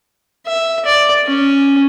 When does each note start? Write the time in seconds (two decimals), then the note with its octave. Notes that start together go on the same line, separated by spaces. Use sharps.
0.47 E5
0.85 D5
1.27 C#4